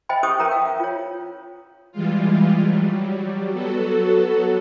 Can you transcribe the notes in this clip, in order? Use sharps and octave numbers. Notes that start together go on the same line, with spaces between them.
C5 D#5 E5 G5 G#5 B5
C#4 G4 C5 C#6 D#6
C#4 A#4 B4 E5 A#5
F5 G5
E5
F4 C#5
E3 G3 G#3 F4
F#3 G3
F#3 B3 F#4 A4